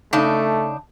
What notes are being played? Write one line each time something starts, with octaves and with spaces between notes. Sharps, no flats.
C#3 A3 D4 D#4